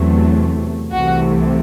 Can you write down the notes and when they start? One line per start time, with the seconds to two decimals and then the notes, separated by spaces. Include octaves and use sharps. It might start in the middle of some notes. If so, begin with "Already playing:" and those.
Already playing: E2 C3 F#3 A3
0.92 C2 C3 E3 A3 F#4